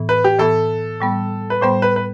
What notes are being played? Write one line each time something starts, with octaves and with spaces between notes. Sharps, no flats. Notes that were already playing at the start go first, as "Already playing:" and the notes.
Already playing: A2 E3 B3
B4
G4
A2 E3 B3 A4
A2 G3 B3
B4
A2 G3 B3 C5
B4
B4